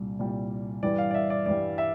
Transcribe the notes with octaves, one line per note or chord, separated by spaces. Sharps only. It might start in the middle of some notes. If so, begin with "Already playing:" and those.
Already playing: C2 A#2 G3
C2 A#2 G3
G2 E3 G3 D5
F5
D5
E5
D5
G2 E3 G3 D5
E5